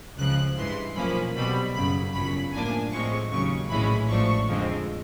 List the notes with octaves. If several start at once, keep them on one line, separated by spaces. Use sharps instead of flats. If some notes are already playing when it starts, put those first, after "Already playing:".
C#2 C#3 F3 F#6
G2 E3 G#3 C6
B1 A#2 F3 A#3 C#4 B5
B1 B2 G3 C4 B5
F#2 C#3 F#3 B5
G1 F#2 C#3 F#3 B5
A2 F3 A#3 D4 G#5
A2 F3 G#3 C4 C#6
D#2 C#3 F#3 C#6
A#1 A2 E3 G#3 C#4 B5
A1 G#2 F3 A3 D4 C#6
F2 D3 F3 G#3 C4